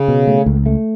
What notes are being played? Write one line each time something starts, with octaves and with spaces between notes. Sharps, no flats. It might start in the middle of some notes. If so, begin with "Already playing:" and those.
Already playing: C#3
B2
A3
C#2
A3